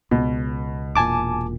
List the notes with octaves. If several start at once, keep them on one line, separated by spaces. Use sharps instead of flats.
C#2 B2
E1 A#2 G#5 A5 D6